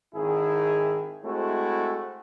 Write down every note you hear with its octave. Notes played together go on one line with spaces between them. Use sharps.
G#1 D#3 E4 G#4
G#3 A3 C4 E4 F#4